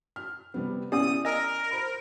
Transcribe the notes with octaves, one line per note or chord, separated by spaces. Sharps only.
F6
C3 G3 B3
B3 C#4 E4 G4 D5 D#6
A#4 D#5 G#5 E6
C5 B5